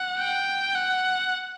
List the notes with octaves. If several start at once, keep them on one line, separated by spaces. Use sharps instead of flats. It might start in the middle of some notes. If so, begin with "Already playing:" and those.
Already playing: F#5
G5
F#5